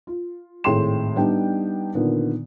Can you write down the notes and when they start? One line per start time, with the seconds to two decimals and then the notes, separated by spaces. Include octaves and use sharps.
0.07 F4
0.64 G#1 A2 G#4 G5 C6 E7
1.16 G3 B3 D4 D#4 G5
1.95 A#2 D3 D#3 B3